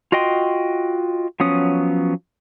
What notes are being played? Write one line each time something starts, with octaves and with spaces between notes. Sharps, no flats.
F4 F#4 D#5 G5 C6
F3 F#3 B3 C#4 D#6